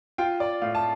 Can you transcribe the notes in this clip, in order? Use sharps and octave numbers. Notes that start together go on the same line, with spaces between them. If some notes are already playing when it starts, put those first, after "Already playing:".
F4 G5
D5
A2 F5
A5